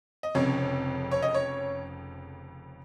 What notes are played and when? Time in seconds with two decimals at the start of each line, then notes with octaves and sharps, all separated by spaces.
0.23 D#5
0.35 F1 F2 C#3 C#5
1.11 C#5
1.22 D#5
1.34 C#5